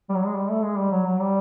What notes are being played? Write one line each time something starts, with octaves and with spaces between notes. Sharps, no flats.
G3
F#3
G#3
G3
A3
G#3
G3
F#3
F#3
G3